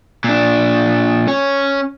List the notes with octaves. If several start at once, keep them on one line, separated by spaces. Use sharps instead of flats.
A#2 D4
C#4